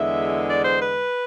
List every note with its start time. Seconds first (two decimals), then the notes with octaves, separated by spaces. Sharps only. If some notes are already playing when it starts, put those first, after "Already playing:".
Already playing: E2 D3 G#3 E5
0.48 D5
0.65 C5
0.80 B4